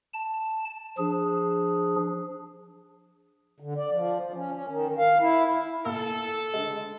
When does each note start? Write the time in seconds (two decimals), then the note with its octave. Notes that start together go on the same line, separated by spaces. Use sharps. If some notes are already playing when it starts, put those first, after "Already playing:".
0.13 A5
0.98 F3 D4 G#4
3.60 D3
3.77 D5
3.91 F3
4.21 F3
4.35 C#4
4.52 C#4
4.68 D#3
4.98 F5
5.19 E4
5.85 A#2 A4 F5 E6
6.54 D3 G#3